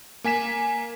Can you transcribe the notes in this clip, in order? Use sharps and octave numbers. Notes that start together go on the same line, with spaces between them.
A#3 G#5 B6 E7